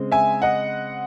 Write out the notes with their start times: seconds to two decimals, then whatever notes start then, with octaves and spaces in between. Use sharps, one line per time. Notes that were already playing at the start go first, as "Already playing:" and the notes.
Already playing: C#3 G#3 C4
0.12 E5 G#5
0.42 D#5 F#5